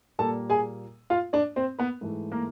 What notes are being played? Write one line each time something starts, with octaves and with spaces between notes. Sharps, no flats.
A#2 G3 A#3 A4 A5
G#4 G#5
F4 F5
D4 D5
C4 C5
B3 B4
G#2 E3 A3
A#3 A#4